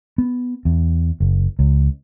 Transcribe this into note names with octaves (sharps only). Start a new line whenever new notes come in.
B3
E2
F#1
C#2